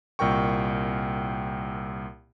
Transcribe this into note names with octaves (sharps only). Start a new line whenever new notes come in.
C2 A#2 A#4 G5 C#6